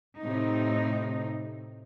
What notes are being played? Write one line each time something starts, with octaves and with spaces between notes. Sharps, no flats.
A2 C3 D#4